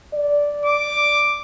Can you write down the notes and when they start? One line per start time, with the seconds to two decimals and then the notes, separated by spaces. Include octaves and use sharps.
0.14 D5
0.66 D6